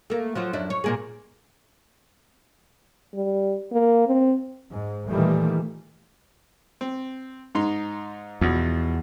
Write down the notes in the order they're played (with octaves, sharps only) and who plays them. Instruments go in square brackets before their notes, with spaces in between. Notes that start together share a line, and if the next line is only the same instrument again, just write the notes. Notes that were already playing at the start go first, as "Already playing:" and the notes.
[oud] A3 A#3
F3 F#3 F4
F#2 D4 E4
C#5
A#2 A#3 G#4
[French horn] G3
A#3
C4
[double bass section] G#2
A#2 D#3 E3 G3 A3
[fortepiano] C4
G#2 D#4 C6
[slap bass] E2 [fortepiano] B2 F3